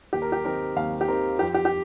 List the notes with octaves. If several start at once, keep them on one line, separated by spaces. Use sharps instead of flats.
D#2 G4
A#4
G4
D#3 C4 D#4 A#4
D#2 F5
G4
D#3 C4 D#4 A#4
F2 G4
G4
G4